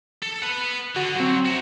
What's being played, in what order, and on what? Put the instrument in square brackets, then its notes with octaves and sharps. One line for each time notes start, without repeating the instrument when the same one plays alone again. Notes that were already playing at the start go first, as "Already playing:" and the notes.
[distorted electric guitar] A4
B4 F#5
[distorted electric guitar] D3 [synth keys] F#4
[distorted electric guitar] F#3 [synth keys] C4 F#4
[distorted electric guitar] F#4 E5